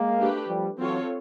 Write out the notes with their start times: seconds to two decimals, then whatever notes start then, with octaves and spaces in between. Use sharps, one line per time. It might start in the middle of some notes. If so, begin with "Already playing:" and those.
Already playing: G#3 A#3
0.18 A3 D4 G4 B4
0.48 F3 G3
0.78 E3 F#3 C4 F4 A4 C#5